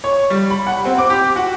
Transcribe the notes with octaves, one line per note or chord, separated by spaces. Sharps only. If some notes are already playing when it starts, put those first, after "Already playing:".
C#5
G3
B5
F#5
C4
D6
G4
F#4